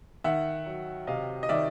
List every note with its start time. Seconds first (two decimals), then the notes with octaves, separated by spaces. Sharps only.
0.24 D#3 E5 F#5
0.66 F#3
1.07 C3 D#5 F5
1.43 D#5
1.49 D#3 D5 E5